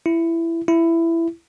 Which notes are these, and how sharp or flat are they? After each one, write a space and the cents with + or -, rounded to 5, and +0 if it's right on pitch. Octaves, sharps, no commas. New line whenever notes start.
E4 +15
E4 +15